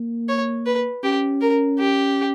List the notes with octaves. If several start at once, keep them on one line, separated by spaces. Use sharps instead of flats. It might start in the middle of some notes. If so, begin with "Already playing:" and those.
Already playing: A#3
C#5
B4
C#4 G4
A#4
G4